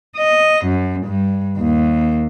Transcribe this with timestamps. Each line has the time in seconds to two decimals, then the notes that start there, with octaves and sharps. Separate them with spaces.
0.16 D#5
0.66 F#2
1.06 G2
1.58 D#2